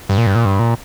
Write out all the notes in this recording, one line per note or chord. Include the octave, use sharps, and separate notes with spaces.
G2
A#2
G2
A#2
G2
A#2